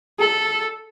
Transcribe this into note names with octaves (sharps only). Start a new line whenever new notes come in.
A4